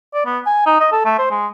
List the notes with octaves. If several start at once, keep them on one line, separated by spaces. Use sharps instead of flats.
D5
B3
G#5
D#4
D#5
A4
A3
C5
G#3